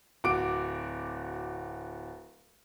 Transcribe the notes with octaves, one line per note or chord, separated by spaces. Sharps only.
D1 F#4 D6 D7